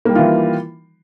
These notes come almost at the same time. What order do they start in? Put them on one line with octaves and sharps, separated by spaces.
A#3 G3 D#3 F4 E3